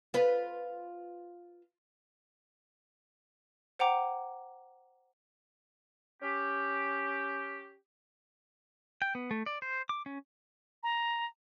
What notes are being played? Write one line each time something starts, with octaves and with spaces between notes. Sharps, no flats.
F4 B4
C5 F#5 G5 A#5 D6
C#4 G4
G5
B3
A3
D5
C5
D6
C#4
A#5